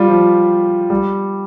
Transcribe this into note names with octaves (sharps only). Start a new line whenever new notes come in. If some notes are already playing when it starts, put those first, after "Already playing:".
Already playing: G3 F4 G4
F3
G3